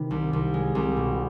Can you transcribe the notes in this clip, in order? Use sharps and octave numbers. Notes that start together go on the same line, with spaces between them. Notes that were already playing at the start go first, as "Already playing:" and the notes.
Already playing: C3 D#3 B4
C2
C2
G#3
C2
B2